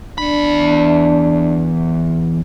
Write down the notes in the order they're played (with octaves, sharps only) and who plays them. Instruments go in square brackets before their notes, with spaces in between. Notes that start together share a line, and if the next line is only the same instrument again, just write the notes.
[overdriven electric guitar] E2 B5 [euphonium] D4